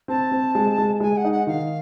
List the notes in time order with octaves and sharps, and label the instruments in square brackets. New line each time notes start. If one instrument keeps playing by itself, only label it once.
[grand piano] C4 [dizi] A5
[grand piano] C4
G#3
G#3
[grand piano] G#3 [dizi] G#5
[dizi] F#5
[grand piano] D#4
[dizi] F#5
[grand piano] D#3 [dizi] F5